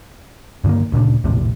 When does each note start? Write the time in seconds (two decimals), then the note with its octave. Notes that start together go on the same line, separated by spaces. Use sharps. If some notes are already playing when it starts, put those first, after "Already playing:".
0.64 G2 D3 D#3 A#3
0.92 D2 A#2 C#3 D4
1.24 A#1 E2 A2 C3